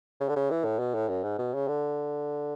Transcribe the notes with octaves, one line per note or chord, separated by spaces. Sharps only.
C#3
D3
C#3
E3
A2
B2
A2
F#2
G#2
B2
C#3
D3